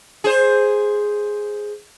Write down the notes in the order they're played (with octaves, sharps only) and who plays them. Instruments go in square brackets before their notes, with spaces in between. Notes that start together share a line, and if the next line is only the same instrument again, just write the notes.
[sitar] G#4 C5